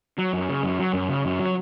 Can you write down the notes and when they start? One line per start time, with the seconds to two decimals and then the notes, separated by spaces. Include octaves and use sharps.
0.18 F#3
0.33 F#2
0.49 C#3
0.64 F#2
0.79 F#3
0.94 F#2
1.09 C#3
1.25 F#2
1.39 F#3